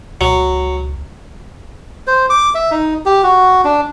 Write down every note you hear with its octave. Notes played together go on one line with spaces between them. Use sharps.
C#2 F#3
C5
D6
E5
D#4
G4
F#4
D4